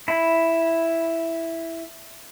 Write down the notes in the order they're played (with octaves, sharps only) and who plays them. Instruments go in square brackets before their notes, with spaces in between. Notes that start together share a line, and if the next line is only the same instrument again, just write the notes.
[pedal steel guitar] E4 B5